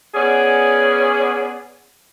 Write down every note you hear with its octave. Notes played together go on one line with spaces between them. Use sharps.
B3 C#4 G#4 D5